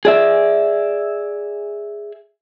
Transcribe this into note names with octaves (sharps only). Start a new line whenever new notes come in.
G#4 D5 E5